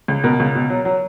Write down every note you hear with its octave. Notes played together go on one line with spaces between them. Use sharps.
C#2
B2 A#4
C#2
B2
F#3
F#3